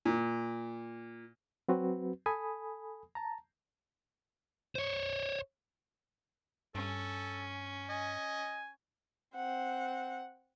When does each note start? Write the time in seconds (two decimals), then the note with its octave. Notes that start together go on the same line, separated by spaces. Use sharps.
0.05 A#2
1.69 F#3 C4 F#4 B4
2.26 A4 G#5 B5 D#6
3.15 A5 A#5
4.75 C5 C#5
6.75 G2 C#4 A4
7.89 D#5 G#5
9.35 C4 F#5